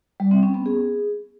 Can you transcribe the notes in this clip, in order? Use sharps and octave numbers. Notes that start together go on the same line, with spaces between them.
G3
C4
C#4
B3
G#4